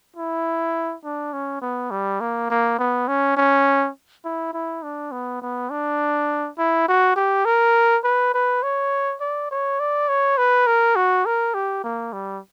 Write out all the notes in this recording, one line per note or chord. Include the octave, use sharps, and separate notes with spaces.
E4
D4
C#4
B3
G3
A#3
A#3
B3
C#4
C#4
E4
E4
D4
B3
B3
D4
E4
F#4
G4
A#4
B4
B4
C#5
D5
C#5
D5
C#5
B4
A#4
F#4
A#4
G4
A#3
G3